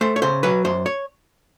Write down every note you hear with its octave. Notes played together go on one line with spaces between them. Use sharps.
A3 C5
C#5
C#3 C5
F#3 B4
F#2 C5
C#5